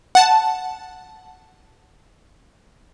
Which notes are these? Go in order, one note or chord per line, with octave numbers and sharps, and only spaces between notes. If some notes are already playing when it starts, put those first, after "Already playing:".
F#5 A5